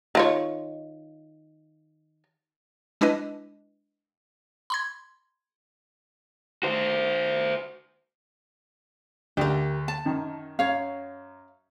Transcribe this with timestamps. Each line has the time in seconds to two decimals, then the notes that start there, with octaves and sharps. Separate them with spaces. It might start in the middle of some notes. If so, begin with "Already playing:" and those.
0.15 D#3 F4 C#5
3.01 G#3 D4 E4 B4 D#5
4.70 B5 C6 G#6
6.63 F#4 C5
9.37 D2 G4 A#4
9.88 A5
10.05 F#2 D#3
10.59 F#2 C#5 F5